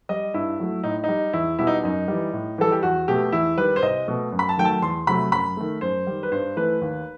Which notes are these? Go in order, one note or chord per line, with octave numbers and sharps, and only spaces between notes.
G3 D#5
G2 E4
F#3 A3
A2 D#4
G3 D#4
E2 E4
B2 G3 E4
D#4
F#2 D#4
E3 G3
A2
E3 G3 A4
G4
E2 F#4
B2 A3 G4
E2 E4
D#3 G3 B4
C5
C2 D#5
B2 A3
F#2
B5
A5
D#3 F#3 A3 G5
A5
E2 C6
C3 F#3 A3 B5
F#2 B5
D#3 A3
F#2 C5
D#3 G3
B4
G2 C5
E3 A3 B4
D#2